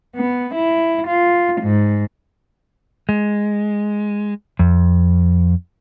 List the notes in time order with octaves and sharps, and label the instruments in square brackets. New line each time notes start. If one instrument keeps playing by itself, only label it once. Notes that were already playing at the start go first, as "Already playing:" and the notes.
[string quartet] B3
E4
F4
G#2
[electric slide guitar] G#3
F2